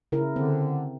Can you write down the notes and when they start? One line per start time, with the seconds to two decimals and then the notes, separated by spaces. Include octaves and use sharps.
0.12 C#3 E4 A#4
0.36 D3 C4